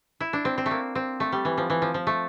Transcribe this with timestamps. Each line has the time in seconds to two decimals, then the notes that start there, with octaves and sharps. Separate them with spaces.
0.20 E4
0.33 D4
0.45 C4
0.58 C4
0.66 A3
0.71 A#3
0.95 C4
1.20 A3
1.32 G3
1.45 E3
1.58 F3
1.70 E3
1.82 F3
1.94 F3
2.07 A3